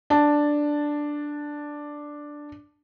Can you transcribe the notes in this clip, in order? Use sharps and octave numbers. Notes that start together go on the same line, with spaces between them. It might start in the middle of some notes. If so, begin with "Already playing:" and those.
D4 A5